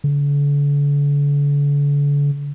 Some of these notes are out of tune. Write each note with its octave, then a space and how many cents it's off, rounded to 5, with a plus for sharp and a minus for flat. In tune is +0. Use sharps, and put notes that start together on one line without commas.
D3 -40